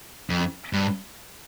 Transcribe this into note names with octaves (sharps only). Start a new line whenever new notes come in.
F2
G2